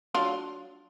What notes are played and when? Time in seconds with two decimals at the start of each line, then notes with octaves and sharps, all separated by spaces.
0.14 F#3 D4 F4